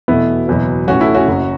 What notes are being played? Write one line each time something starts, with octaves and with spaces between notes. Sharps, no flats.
E2 B2 A3 B3 E4
F#1 E2 B2 F#3
A1 A2 E3 C#4 F#4
E4 A4
C#4 F#4
F#1 F#2 F#3